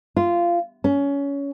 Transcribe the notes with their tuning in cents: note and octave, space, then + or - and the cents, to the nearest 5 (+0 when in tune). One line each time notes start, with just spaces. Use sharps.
F4 -15
C#4 +20